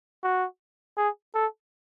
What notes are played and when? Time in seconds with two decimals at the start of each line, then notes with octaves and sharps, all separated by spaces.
0.23 F#4
0.97 G#4
1.35 A4